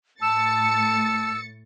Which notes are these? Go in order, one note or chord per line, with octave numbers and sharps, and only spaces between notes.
A2 A5 E6 A6 C#7